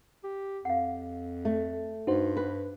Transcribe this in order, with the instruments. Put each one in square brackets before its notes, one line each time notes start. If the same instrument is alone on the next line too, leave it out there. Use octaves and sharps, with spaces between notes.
[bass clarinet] G4
[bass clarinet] F2 [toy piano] F5 F#5
[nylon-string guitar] A3
[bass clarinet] G2 [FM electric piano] D#4 F#4 C5
[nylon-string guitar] B4